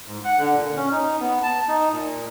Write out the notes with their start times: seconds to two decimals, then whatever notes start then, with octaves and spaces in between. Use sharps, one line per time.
0.06 G#2
0.25 F#5
0.39 D3
0.56 A#2
0.76 C#4
0.92 D#4
1.20 B3
1.43 A5
1.68 D#4
1.92 A#2